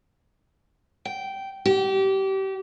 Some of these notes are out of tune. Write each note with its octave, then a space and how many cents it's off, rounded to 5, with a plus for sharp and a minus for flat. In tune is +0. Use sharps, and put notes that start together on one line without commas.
G5 -10
G4 -25